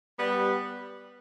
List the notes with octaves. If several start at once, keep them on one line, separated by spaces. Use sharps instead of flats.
G3 B3